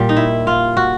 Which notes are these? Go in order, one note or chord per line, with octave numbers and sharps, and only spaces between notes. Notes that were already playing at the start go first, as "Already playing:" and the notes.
Already playing: A#2 G3
D#4
E4
F4
F#4